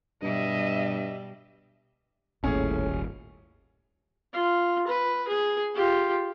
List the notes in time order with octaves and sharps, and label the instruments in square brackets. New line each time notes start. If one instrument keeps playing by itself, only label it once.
[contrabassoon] G2 [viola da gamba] B2 G3 [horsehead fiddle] D#5 E5
[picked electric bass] D#1 [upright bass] G#1 A#3 [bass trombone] A2 [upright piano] C#4 G#4
[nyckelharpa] F4
B4
G#4
F4 G4